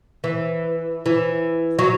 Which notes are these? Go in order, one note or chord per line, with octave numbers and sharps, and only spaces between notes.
E3
E3
F#3